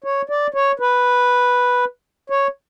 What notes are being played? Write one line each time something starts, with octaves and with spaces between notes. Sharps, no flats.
C#5
D5
C#5
B4
C#5